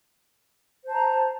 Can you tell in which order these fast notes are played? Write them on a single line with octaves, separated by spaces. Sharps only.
C5 A5 A#5